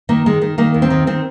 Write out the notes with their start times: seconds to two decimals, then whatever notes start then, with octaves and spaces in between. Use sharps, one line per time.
0.09 D#3 A#3
0.26 D#3 G#3
0.42 D#3
0.58 D#3 A#3
0.74 D#2
0.82 C4
0.90 D#3
1.07 D#3 C4